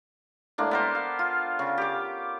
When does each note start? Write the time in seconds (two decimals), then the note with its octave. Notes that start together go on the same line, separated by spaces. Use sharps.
0.58 A2 G#3 A#3 D4
0.71 B3 A#4 C5
0.95 F5
1.19 F4
1.59 C#3
1.78 G4 D6